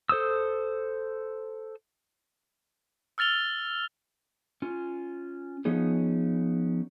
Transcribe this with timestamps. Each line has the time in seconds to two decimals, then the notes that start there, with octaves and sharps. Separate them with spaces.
0.09 A4 C5 D#6 E6
3.18 E6 F6 A6 F7 G7
4.62 C#4 F4
5.65 F3 B3 C#4 D#4 G#4